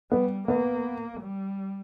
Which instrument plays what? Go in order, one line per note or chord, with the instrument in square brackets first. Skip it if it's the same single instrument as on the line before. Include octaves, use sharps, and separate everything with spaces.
[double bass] G3 [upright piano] B3
[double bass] A#3 [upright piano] B3
[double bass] G3